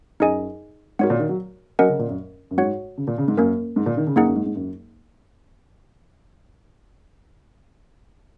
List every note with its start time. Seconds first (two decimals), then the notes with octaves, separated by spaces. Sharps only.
0.20 F#2 D#4 G#4 D#5 G#5
0.99 G#2 F#4 A#4 C#5 F#5
1.10 A#2
1.19 D#3
1.29 F#3
1.79 F#3 C#4 A#4 D#5 F#5
1.89 C#3
1.99 A#2
2.09 F#2
2.51 F#2
2.57 G#2 F#4 C#5 F#5
2.98 C#3
3.07 A#2
3.18 C#3
3.28 G#2
3.37 F#2 A#3 C#4 A#4
3.76 G#2
3.86 A#2
3.97 D#3
4.07 C#3
4.16 F#2 A#3 D#4 G#4 F#5
4.27 F#2
4.36 G#2
4.46 G#2
4.56 F#2